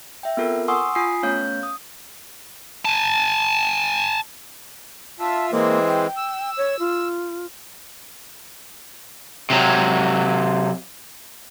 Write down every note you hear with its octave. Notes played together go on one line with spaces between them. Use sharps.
E5 G5
B3 C4 F4 A4 A#4
F#5 G#5 C6 C#6 D#6 E6
F4 G#5 D#6 B6 C7
A3 B3 C#4 C#5 F5 G6
D#6
G#5 A5
F4 E5 A5
E3 G#3 A#3 C4
G5
E6
C#5
F4
C3 F#3